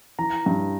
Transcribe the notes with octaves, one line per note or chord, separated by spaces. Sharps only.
E3 A#5
G2